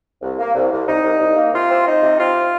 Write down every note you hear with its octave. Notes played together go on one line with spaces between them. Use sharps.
C2
A#3
C2
C2
C2 D#4
C2
C2
A#3
C3 F4
C4
C4 D#4
C3
C4 F4